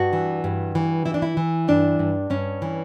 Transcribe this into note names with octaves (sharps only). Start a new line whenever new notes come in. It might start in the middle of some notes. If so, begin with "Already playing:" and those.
Already playing: G2 F#4
E3
G2
E3
E3 E4
D4
E4
E3
G2 D4
G2
G2 C#4
E3